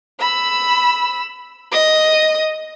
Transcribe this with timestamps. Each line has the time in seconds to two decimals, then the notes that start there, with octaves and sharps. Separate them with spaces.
0.20 B5 E6
1.72 D#5 D#6